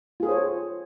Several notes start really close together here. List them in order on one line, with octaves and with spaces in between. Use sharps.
F4 G#4 A4 C5 C#5